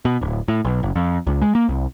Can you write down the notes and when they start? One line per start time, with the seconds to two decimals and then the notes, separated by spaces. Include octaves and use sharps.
0.05 B2
0.21 D1
0.48 A2
0.65 B1
0.83 F#1
0.96 F2
1.27 C#2
1.42 G#3
1.55 A#3
1.69 C2